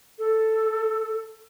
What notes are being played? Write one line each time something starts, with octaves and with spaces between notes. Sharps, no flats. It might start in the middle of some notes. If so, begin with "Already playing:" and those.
A4